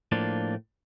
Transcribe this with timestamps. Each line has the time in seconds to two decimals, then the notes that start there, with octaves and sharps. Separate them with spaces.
0.12 A2 F3 A#3 D4